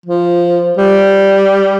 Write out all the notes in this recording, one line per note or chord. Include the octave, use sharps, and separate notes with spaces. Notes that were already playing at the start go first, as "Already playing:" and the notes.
F3
G3